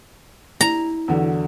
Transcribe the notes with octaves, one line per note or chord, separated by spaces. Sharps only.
E4 A#5
E2 D3 F#3